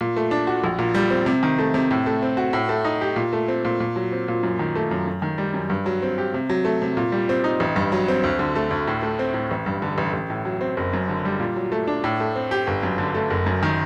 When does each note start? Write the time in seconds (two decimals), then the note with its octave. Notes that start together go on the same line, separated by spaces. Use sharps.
0.01 A#2
0.17 A3
0.31 D4
0.47 F#4
0.64 A#1
0.79 A#2
0.94 G3
1.10 C4
1.26 C3
1.43 D#3
1.59 A3
1.74 C3
1.91 A2
2.06 A3
2.22 C4
2.37 F#4
2.53 A2
2.69 A3
2.85 D#4
3.01 G4
3.16 A#2
3.33 A3
3.48 C4
3.65 A#2
3.80 A#2
3.96 F#3
4.12 C4
4.28 A#2
4.43 F#2
4.59 D#3
4.75 A3
4.91 F#2
5.07 F#2
5.22 D#3
5.38 G3
5.54 F#2
5.70 G2
5.86 F#3
6.02 C4
6.18 G4
6.34 C3
6.49 F#3
6.65 A3
6.82 C3
6.97 A#2
7.12 G3
7.29 C4
7.44 D#4
7.60 A1
7.76 G2
7.92 F#3
8.08 C4
8.23 D2
8.39 D3
8.56 A3
8.70 D2
8.88 A2
9.02 A3
9.19 C4
9.34 A2
9.51 A1
9.66 G2
9.82 D3
9.98 A1
10.13 A1
10.30 A2
10.45 F#3
10.61 C4
10.77 F#1
10.93 F#2
11.09 D3
11.25 G3
11.40 A#2
11.56 F#3
11.72 A3
11.87 D4
12.04 A2
12.20 A3
12.36 C4
12.51 G4
12.67 G1
12.83 F#2
12.98 D3
13.14 A3
13.30 F#1
13.46 F#2
13.63 D#3